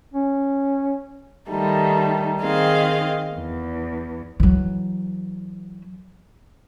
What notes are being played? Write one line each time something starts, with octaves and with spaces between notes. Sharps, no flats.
C#4
D#3 G3 A3 D#4
D#3 C4 G#4 D#5 F5
E2
E3 F#3